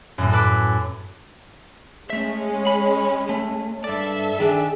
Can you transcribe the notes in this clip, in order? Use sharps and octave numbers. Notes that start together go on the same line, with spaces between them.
F#2 A2
A4 B4 D6
G#3 A3 C#4 E5
B5
A3
G2 A4 D5 E5
D#3 D4 G#4